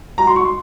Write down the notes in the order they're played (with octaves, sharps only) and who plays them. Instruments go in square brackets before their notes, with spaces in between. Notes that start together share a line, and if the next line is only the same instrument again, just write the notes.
[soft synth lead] F#4 [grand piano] A#5
[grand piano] C6
C#6
C6